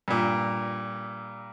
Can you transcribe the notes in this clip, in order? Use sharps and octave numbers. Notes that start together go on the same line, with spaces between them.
G2 A#2